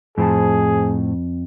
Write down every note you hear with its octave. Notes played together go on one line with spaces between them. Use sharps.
F2 A2 G#4 C5 A5